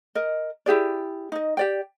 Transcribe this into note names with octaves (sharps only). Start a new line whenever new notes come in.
A#4 D#5
E4 G4 G#4 D5
D#4 D#5
G4 D5 G5